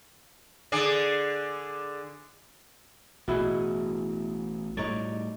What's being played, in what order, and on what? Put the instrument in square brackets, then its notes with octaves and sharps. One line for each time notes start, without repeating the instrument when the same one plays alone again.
[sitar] D3 G#4 D5
[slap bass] A1 B3 [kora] B2 E4 G#4
[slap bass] A2 G3 [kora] D#4 C#5 D5